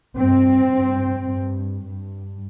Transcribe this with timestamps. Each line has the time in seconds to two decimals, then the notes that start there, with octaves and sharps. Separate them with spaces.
0.16 G2 C4
0.72 G2
1.28 G2
1.83 G2